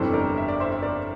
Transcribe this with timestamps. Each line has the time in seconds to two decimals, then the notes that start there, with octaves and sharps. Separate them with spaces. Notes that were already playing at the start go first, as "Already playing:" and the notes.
Already playing: G1 F2 C3 E3 G3 A4 C5
0.13 A#4 D5
0.37 E5
0.48 D5
0.60 C5 E5
0.72 E5
0.83 A#4 D5